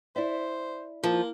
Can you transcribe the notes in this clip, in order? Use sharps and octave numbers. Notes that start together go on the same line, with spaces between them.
E4 C5 D5 E5
F3 A#3